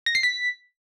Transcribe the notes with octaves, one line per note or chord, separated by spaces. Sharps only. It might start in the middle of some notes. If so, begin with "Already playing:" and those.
A#6
C7
B6